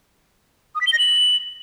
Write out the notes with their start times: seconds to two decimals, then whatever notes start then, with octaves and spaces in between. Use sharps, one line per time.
0.75 D#6
0.81 B6
0.87 G7
0.93 A#6
0.99 F#7